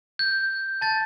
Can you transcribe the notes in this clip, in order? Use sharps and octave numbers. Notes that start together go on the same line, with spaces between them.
G6
A5 G6 A6